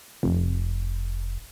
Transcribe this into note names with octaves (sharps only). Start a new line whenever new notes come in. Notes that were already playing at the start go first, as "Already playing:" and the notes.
F1